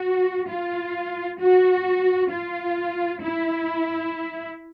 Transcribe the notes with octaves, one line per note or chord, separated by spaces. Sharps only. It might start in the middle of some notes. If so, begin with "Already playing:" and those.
Already playing: F#4
F4
F#4
F4
E4